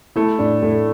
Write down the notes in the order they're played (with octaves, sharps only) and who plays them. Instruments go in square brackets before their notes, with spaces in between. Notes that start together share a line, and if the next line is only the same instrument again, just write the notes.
[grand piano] A3 [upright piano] E4
[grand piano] A2 [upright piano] D4
[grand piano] A2 [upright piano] A3